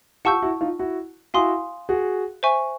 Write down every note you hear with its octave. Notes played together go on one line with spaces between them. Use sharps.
F4 G4 F#5 A5 C#6 E6 G6
E4 F#4
D#4 F4
E4 F#4
E4 F#4 F5 G#5 C6 D#6
F#4 G#4
C5 E5 G#5 C#6